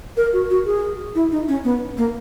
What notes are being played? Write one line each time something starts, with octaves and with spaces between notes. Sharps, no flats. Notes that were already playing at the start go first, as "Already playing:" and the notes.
A#4
F#4
F#4
G#4
E4
D#4
C#4
B3
A#3